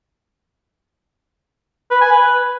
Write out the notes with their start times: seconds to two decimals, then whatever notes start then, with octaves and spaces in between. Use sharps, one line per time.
1.91 B4
2.01 G#5
2.11 B4